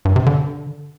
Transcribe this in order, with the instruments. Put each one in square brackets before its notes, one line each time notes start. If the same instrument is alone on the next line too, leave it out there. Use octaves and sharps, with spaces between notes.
[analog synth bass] G2
C3
D3